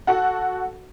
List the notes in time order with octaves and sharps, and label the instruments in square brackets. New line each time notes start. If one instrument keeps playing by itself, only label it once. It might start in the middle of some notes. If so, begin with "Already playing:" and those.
[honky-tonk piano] F#4 A4 F#5